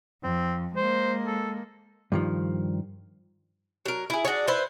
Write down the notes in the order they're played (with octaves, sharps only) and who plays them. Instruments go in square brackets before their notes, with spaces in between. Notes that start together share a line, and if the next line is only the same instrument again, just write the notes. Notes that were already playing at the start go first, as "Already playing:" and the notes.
[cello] F2 [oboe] C4
[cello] G#3 A#3 [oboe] C5
[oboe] A4
[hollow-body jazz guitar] G2 D#3 F3
[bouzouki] F#3 A#4
E4 G#4
D4 F#4 G#4 C#5
E4 B4 C5 E5